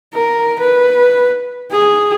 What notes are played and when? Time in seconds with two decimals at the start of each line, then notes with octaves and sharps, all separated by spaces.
0.14 A#4
0.59 B4
1.71 G#4